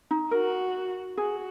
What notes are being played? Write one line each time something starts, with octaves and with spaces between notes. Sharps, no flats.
D#4
F#4 A#4
F#4 G#4